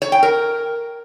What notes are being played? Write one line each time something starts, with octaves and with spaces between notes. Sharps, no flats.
C#5
G5
A#4